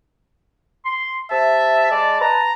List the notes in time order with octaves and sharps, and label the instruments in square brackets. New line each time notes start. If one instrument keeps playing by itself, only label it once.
[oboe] C6
[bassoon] C3 [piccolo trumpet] E5 [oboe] A5
[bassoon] G#3 [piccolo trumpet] D5
[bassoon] B4 [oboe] A5 [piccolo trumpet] A#5